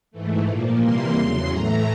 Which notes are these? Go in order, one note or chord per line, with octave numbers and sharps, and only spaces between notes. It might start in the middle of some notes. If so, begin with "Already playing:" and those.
G#2 E3 A3
A#2 F3 A#3
C3 E3 G3 A#3 C6
E2 C#3 F#3 C6
A2 E3 A3 A#5